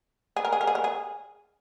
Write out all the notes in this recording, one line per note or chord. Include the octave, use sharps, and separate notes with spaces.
G#4
A#4
G#4
A#4
G#4
A#4
G#4